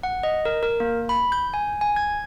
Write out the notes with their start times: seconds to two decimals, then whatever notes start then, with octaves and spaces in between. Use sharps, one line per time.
0.03 F#5
0.23 D#5
0.45 A#4
0.63 A#4
0.80 A#3
1.09 B5
1.32 G6
1.54 G#5
1.81 G#5
1.96 G#6